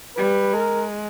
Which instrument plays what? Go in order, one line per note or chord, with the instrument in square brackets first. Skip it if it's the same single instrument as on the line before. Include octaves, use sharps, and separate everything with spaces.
[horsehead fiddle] G3 [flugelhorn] B4
[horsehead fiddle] G#3 [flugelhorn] A#4